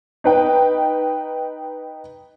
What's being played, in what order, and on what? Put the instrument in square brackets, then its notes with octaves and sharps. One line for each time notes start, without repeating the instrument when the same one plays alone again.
[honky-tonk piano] D#4 B4 G5